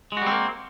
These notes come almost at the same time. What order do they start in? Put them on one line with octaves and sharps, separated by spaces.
G#3 F#4 G3 C4 A#3